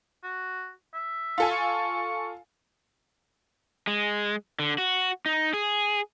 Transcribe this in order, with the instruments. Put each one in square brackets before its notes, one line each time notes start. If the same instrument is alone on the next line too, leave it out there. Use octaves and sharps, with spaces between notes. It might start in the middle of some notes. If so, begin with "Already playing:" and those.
[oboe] F#4
E5
[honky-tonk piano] F4 A4 G#5
[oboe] C#6
[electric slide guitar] G#3
D3
F#4
D#4
G#4